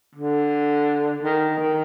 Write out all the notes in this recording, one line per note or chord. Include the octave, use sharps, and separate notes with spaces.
D3
D#3
D#3